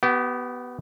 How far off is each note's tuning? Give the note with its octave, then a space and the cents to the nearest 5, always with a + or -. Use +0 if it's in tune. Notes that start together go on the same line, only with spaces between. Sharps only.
B3 +0 G4 -35